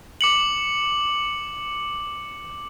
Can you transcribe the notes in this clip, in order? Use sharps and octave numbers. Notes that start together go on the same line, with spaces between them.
D6 C#7 F#7